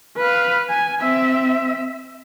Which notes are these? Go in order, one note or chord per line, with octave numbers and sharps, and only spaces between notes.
B4 F5
G#5
C4 E5